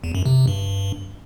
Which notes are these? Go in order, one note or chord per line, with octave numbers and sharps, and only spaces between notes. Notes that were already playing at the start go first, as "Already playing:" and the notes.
E2
F#2
C3
C3
G2